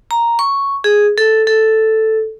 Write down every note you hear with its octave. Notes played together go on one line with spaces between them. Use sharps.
A#5
C#6
G#4
A4
A4